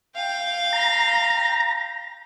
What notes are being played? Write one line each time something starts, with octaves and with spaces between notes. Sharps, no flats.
F5 G5
A#5